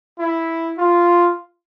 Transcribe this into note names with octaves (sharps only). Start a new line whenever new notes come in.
E4
F4